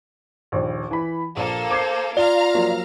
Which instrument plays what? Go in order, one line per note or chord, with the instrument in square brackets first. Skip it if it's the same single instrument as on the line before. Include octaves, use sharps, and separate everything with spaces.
[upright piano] A#1 D#2
E3 B5
[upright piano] A#1 [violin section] A#3 A4
[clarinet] C5 [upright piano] D6 G#6 C7
[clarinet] F4 [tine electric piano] D5 [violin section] F5 A#5 F6 [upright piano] G7
[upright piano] F3 F#3 A#3